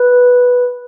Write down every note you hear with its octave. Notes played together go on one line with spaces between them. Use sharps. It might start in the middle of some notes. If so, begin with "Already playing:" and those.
Already playing: B4